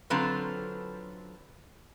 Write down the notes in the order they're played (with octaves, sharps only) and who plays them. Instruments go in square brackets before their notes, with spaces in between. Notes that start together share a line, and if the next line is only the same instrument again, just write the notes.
[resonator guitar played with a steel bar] D3 F#3 C4 F4 A4 B4